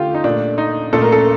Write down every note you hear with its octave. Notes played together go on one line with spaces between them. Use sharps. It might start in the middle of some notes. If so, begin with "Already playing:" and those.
Already playing: D3 A3 F4 G4
D#4
A#2 A3 D4
D#4
A#2 A3 A4
A#4
A4